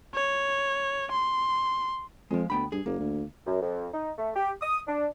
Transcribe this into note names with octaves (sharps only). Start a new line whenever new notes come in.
C#5
C6
F2 F3 G#3
D2 B3 G5 B5
G2 G#4
F#1 A#3
D2
F#2
F2
D#4
A3
G4
D#6
D4